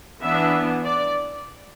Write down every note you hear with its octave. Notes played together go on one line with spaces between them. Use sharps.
E3 B3 D4 E5
D5